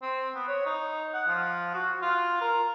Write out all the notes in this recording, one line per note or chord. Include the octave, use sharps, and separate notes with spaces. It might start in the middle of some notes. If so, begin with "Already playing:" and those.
C4
B3
C#5
D#4
F#5
F3
F#4
F4
A#4